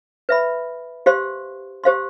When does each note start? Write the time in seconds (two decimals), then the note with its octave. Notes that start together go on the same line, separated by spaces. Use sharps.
0.29 B4 E5 B5
1.06 G4 C5 F5 C6
1.84 G4 C5 F5 C6